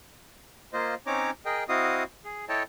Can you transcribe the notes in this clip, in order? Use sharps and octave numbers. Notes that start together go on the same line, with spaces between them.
A#3 F4 C5 D#5
C4 C#4 D#4 C#5 A#5 D6
G#4 A#4 D#5 G5
C4 E4 F#4 D#5 F5 D#6
G#4
E4 A4 C#5 D#5 G5 A5